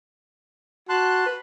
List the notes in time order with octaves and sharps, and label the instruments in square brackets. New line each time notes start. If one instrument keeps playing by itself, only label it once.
[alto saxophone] F#4 [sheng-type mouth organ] A5 C6 F#6
[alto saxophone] B4